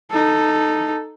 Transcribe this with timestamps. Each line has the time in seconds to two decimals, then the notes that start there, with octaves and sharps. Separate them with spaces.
0.11 D#4 A4